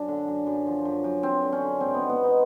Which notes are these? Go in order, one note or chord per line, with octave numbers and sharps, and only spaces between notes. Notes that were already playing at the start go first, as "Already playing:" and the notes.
Already playing: F#2 D4
D3
F#2
F#2
F3
F#2
F#2
F#2 C4
D3
C#4
D3
G#2 C4
B3
D#3
B3
G#2 D#4